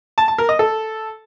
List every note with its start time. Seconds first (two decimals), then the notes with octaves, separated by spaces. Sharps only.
0.18 A5
0.28 A5
0.38 A#4
0.49 D#5
0.59 A4